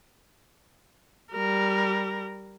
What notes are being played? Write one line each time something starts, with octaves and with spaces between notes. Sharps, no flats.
G3 A#4